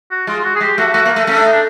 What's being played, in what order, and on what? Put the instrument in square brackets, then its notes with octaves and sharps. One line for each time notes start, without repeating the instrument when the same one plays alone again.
[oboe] F#4
[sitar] G#3 [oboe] F4
[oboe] F#4
G#4
[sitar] G#3 [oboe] G4
[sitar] A3 [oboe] F#4
[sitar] A3 [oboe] F#4
[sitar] A#3
A3
[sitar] A3 [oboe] C#4
[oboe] D4
D#4
D4